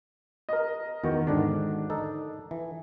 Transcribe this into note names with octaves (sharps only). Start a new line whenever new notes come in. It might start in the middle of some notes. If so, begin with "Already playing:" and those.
A#4 D#5
E2 D#3 F#4
G#2 D3 D#3 D4
D#4 A4
E3